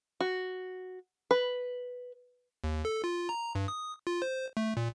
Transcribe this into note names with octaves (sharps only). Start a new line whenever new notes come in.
F#4
B4
D#2
A4
F4
A#5
G2
D#6
F4
C5
A3
A#2